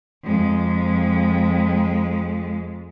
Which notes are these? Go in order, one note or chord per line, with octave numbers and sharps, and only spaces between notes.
F2 G#3